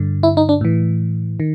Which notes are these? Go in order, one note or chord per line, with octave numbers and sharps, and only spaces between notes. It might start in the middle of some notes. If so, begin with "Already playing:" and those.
Already playing: G2 D3
E4
D#4
D4
A2 E3
D#3